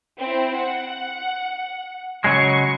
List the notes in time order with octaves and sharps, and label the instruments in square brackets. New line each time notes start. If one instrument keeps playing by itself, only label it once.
[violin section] C4 E4
F#5
[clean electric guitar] C#3 F#3 G#3 [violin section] C#6